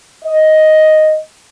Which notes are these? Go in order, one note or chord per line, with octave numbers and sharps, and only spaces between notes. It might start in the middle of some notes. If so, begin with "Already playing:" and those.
D#5